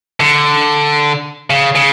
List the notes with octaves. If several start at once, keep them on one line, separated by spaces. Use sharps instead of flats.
D3
C#3
C#3